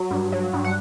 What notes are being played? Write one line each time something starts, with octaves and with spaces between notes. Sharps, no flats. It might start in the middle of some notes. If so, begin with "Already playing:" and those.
Already playing: F#3
G2
F#3
G2
F#5